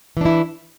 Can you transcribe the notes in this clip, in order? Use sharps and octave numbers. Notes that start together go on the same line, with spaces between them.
E3 D4 E4